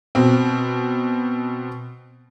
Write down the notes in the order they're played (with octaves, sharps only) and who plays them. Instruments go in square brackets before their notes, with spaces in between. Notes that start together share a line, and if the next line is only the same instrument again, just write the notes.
[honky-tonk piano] B2 C4